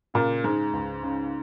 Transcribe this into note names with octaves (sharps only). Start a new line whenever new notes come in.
A#2 C#3
G#2 G#3
C#2
C#3